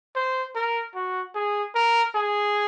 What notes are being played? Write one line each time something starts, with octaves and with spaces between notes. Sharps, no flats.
C5
A#4
F#4
G#4
A#4
G#4